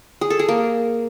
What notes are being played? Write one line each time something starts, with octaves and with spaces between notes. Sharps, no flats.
G#4
A4
G#4
A#3